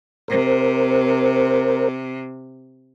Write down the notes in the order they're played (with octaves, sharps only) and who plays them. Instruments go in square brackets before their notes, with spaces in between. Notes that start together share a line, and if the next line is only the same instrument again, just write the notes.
[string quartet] C3 [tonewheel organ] A#4 C5